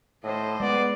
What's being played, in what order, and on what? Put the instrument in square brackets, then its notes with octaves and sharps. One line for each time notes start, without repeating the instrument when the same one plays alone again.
[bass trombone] A2 [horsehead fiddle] C5 D#5
[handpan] G#3 [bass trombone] B3 [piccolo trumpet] D5